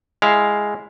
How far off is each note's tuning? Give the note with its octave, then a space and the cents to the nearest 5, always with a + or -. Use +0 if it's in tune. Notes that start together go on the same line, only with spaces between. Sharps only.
G#3 +0 E4 +0 F5 +0